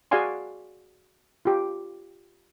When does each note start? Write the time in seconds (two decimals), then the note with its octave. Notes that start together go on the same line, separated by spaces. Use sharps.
0.11 F#4 G#4 D5 F5 G#5 C6
1.45 F4 G4